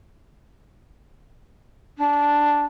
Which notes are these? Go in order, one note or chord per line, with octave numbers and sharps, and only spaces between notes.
D4